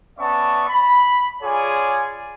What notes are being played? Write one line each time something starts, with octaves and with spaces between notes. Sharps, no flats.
B3 C#4 D5 E5 A5 C#6
B5
F4 G#4 C#5 D5 G#5